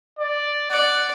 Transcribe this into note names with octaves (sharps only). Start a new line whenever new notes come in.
D5
D5 F#5